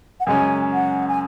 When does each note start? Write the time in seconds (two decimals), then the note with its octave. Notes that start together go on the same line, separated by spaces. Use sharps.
0.20 F#5
0.27 F#2 C#3 G#3 C#4 G#5
0.74 F#5
1.08 G#5